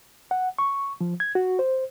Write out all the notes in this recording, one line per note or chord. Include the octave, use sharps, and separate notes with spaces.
F#5
C#6
F3
G#6
F#4
C5